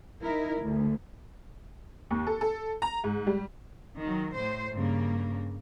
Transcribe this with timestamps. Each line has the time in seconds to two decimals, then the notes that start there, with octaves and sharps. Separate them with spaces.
0.21 D#4 E4 A#4
0.60 D2
2.11 D#2
2.27 A4
2.41 A4
2.82 A#5
3.04 G#2
3.27 G3
4.01 D#3 F#3
4.33 A2 C5
4.73 G2 C#3 A#3